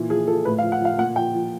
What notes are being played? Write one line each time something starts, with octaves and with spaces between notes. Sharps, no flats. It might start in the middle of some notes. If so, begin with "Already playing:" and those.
Already playing: A#2 E3
F3 G#4
F3 A4
A2 B4
F5
F3
F#5
F3 F5
A#2 F#5
F3 G5
F3